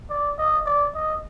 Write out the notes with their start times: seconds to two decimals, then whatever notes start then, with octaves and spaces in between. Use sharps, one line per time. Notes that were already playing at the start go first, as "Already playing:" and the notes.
0.10 D5
0.38 D#5
0.66 D5
0.95 D#5